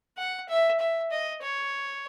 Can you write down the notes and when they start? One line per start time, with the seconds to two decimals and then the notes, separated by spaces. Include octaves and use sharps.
0.18 F#5
0.48 E5
0.80 E5
1.11 D#5
1.42 C#5